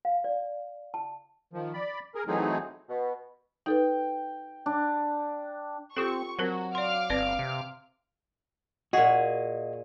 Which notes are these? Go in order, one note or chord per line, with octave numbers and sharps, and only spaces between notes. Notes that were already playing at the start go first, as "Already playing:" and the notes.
F5
D5
A5
D#3 F3
D5 B5
G#4 A#4
E3 F#3 A3 C4 D#4 G#4
B2
D#4 A4 B4 G5
D4
C4 F4 G4 A4 C#6
F#3 C4 F#4 A#4 C5
D5 F5 C6 D6 F6
G1 C4 B4 D5
C3
A#2 F#4 G#4 D#5